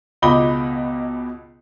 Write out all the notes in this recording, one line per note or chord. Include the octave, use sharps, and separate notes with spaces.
C#2 B2 D#5 B5 D6 G7